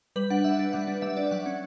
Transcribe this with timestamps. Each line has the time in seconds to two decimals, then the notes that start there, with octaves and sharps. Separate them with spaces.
0.16 G3 B4
0.30 D4 F#5
0.44 G3 E5
0.59 D4
0.73 G3 F#5
0.87 D4
1.02 G3 E5
1.17 D4 D5
1.31 F#3 F#5
1.46 C#4